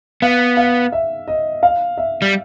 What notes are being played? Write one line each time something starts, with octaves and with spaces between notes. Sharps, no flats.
B3 F5
F5
E5
D#5
F5
E5
G3